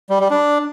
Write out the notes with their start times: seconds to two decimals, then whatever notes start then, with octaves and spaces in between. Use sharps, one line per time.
0.10 G3
0.20 G3
0.31 D4